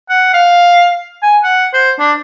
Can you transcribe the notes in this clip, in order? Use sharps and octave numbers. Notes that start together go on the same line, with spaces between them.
F#5
F5
G#5
F#5
C5
D4